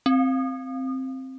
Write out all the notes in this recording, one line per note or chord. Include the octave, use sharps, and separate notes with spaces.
C4